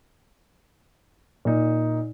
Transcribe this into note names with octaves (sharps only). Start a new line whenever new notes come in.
A#2 D#4